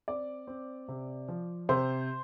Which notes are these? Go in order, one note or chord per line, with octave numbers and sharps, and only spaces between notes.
C4 D5
C4
C3
F3
C3 C5